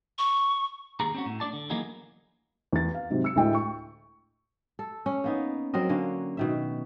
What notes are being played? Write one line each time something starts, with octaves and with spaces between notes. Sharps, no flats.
C#6
D#2 G#4 A#5
C4 C#4 F#4
A2
D4 F#4 D5 A5
D3
E3 F#3 A#3 B3 D#4 G#4
E2 A6
F5
G#2 C3 F#3
E6 C#7
D2 A2 G#3 G5
C#6
A4
C#4
A#3 B3 D#4
F#3 C4 A#4 D#5
D3 A#3 C#4
B2 D#3 E5